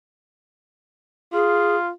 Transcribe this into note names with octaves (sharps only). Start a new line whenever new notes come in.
F4 G#4